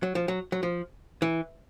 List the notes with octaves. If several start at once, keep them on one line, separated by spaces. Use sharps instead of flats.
F#3
F3
F#3
F#3
F3
E3